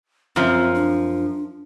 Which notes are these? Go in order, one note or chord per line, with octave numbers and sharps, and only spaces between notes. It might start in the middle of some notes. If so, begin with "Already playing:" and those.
F#2 F3 C4
D4